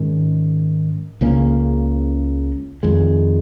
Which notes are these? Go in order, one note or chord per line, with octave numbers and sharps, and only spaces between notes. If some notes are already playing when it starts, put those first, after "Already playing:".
Already playing: G#2 D#3 G#3 C#4
C#2 C#3 A#3 C#4
F2 D#3 G#3